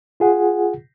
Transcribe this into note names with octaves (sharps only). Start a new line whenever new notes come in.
F4 G#4 F#5